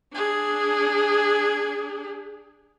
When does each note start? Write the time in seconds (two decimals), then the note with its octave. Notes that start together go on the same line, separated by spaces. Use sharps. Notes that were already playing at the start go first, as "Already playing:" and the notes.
0.13 D4 G#4